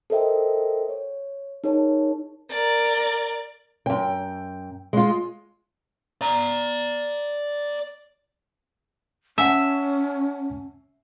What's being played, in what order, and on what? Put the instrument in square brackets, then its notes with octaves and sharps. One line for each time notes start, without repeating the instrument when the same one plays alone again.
[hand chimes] A4 A#4 C5 D#5 E5 G5
C#5
D#4 G#4 A#4 C#5 A5
[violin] A#4 D5
[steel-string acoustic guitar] F#2 G5
G#3 F4
[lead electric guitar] D5 A#5
[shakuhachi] C#4 [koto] E5 [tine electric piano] F#5 G#5 A5